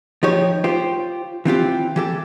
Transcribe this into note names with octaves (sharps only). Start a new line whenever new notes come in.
F3 D#4 G4 C#5
F4 G4 C5
E3 C4 F4 G4
E3 G4 A4